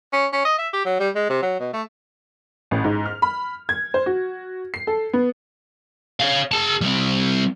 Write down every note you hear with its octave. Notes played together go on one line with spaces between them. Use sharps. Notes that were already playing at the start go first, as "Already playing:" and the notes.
C#4
C#4
D#5
E5
G4
F#3
G3
G#3
C3
F#3
B2
A3
A1
G#2
F6
B5
G#6
C5
F#4
C7
A4
B3
C#5 F5
G#4 A5
G3 C4